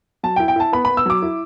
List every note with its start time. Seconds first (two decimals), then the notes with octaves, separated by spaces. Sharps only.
0.23 F#3 A5
0.36 G5
0.40 E4
0.48 G5
0.56 E4 A5
0.73 B3 B5
0.85 B3 B5
0.97 E6
1.06 F#3 D6
1.22 E4